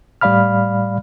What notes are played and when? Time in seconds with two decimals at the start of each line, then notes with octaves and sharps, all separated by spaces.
0.21 A2 G3 D5 F5 B5 F6